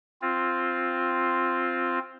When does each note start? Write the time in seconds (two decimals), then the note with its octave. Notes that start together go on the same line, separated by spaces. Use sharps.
0.22 C4 F4